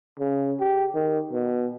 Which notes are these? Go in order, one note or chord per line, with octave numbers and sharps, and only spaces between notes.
C#3
G4
D#3
B2